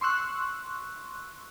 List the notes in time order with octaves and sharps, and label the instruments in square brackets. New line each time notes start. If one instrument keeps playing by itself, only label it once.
[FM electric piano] C6 C#6 E6 F#6